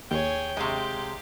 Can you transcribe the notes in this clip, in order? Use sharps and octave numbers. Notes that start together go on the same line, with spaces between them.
D#2 G#4 C#5 G5
C3 G#3 G4 F5